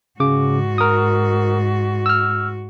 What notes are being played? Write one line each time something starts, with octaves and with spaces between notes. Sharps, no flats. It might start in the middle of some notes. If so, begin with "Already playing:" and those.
G#2 C#3 F#4 D6
A#4 D#6
E6 F6